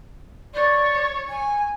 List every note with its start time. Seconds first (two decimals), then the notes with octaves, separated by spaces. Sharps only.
0.54 C#5 D5
1.29 G#5